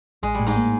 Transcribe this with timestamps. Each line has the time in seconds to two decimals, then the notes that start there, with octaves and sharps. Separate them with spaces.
0.23 A1 G#3
0.35 G3
0.40 A2
0.47 G#2 G#3
0.56 A#3